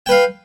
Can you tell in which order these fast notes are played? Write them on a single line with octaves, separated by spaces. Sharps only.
G5 B4 F5